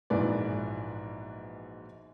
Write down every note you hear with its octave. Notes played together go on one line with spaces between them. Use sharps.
A#1 G#2 B2 E3 B4 D5